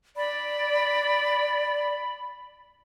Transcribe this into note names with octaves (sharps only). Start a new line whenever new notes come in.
D5 B5